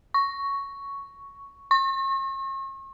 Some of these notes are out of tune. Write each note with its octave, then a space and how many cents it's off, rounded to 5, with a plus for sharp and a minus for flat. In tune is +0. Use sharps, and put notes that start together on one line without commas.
C#6 +5
C#6 -40